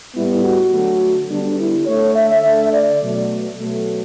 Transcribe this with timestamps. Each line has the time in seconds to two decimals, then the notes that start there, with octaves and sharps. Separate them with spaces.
0.15 A2 G3 B3 E4
0.43 F#4
0.72 D3 F#3 A3
1.29 D3 G3 B3 D4
1.59 E4
1.87 D3 A3 C#5
2.16 E5
2.44 D3 A3
2.72 D5
3.02 B2 F#3 A3
3.59 B2 F#3 A3